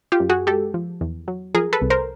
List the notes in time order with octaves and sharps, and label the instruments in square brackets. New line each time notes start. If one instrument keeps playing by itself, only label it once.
[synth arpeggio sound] F4 G4
F#2
F#4 G#4
G#3 G4 A4
F3
E2
F#3
F3 G#4 A#4
A4 B4
C2
A#4 C5